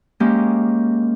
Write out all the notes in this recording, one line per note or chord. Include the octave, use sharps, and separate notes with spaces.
G#3 A#3 C#4 G4